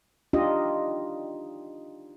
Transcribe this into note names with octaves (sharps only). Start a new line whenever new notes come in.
D4 D#4 F4 G4 D#5